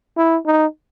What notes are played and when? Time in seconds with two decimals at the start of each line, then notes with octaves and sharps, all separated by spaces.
0.17 E4
0.46 D#4